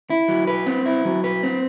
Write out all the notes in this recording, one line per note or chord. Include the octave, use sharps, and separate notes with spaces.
E4
F#3
B4
C4
E4
F#3
B4
C4